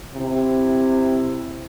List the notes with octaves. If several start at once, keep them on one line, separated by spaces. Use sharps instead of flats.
C3 E4